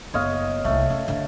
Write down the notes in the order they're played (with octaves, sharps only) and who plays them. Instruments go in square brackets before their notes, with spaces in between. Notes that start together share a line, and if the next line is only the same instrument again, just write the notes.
[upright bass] F#1 B3 [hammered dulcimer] C#5 D#5 F5
[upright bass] C2 A#3 [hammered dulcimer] A3
[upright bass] C#4
D3 D4